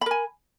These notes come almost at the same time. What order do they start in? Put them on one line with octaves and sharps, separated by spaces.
B5 A#4 G#5